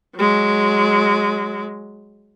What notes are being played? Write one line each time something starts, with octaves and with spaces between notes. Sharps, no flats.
F#3 G#3